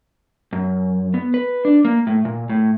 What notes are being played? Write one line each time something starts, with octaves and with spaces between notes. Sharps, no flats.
F#2
B3
B4
D4
A#3
A2
A#2
A2